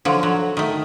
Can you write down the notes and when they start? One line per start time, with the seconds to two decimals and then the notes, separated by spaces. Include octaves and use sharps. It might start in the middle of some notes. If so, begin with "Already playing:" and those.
0.05 D3 F3 F#3
0.23 F#3
0.57 D#3 A3